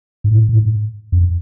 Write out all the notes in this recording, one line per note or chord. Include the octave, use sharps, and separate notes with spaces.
G#2
A2
A2
G#2
F2